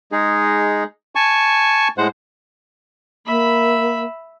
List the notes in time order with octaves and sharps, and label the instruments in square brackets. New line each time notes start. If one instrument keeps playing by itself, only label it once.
[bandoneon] G#3 D#4 G#4
G#5 A5 C#6
A2 G#3 C5 F#5
[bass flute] A#3 [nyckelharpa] E5 B5